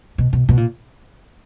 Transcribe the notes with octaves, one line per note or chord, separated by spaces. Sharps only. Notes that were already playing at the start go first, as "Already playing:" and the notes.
B2
B2
B2
A#2